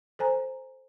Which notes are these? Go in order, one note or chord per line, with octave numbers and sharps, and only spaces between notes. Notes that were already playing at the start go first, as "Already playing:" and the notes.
A4 C5 G#5 A#5